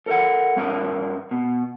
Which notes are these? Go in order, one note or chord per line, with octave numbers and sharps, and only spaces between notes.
A4 A#4 E5 F#5
G2 C#4 A#4 B4
B2